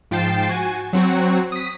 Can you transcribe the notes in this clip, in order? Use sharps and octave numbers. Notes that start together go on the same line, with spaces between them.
G#2 F3 G5 A6 C7 E7
F#4 G#5
F#3 C4 F#4
D#6 B6